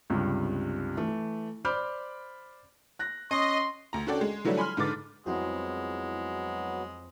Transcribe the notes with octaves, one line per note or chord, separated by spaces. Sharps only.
C#2 G2 C3
E3 A3
C5 D5 B5 D6 F6 G6
F#6 A#6
C#4 D#5 C6
D2 A#5
C#4 D4 F#4 A4 D5 G5
G#3
E3 F#3 G3 A3 D4 E4
G#5 B5 C6 F6
G#2 D3 B4 D6 A6
F2 F#3 G#3 B3 C4 E4 F#4 G#4